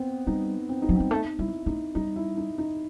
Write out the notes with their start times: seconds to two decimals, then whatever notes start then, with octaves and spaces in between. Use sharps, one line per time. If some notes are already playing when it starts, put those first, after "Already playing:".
Already playing: B3 C4
0.27 G3 D#4
0.69 C4
0.82 D#4
0.89 F#3
0.96 C4
1.00 G3
1.10 A3 D#4
1.39 G3 E4
1.66 A3 D#4
1.95 G3 D#4
2.16 E4
2.37 D#4
2.58 D#4